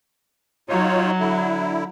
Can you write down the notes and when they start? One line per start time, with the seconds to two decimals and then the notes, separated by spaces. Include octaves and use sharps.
0.69 F#3 D#4 F4 C#5
1.19 D3 E4